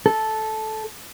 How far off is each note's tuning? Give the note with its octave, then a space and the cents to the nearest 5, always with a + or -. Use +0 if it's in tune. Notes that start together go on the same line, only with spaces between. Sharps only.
A4 -10